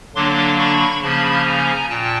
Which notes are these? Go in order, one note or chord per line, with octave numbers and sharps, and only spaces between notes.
D3 F#3 A#3 D4 C6 D6
B5 C#6
C#3 F3 A#3 C#4 A5 B5
G#5 A#5
A#2 G5 A5